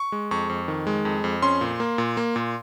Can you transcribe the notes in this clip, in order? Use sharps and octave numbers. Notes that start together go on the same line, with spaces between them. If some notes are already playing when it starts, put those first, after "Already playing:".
Already playing: C#6
G#3
F2 C#6
F2
D#3
G#3
F2
F2
C#4 C6
A#2
A#3
A#2
A#3
A#2